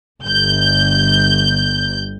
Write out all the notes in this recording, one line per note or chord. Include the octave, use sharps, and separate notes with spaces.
G1 G6